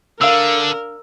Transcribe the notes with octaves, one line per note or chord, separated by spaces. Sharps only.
D3 D4 A#4 D5 F5 E6